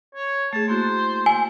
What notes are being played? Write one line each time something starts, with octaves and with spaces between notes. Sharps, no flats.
C#5
A3 G#4 A5
A#3 E4 F#4 C5
G#5